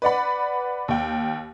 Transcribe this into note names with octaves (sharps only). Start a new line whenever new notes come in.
B4 D5 F#5 B5
D#2 G5